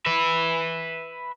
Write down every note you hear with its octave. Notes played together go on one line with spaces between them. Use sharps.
B4 E5